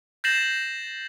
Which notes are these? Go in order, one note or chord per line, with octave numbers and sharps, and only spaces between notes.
G6 A6 A#6 C7 E7 F#7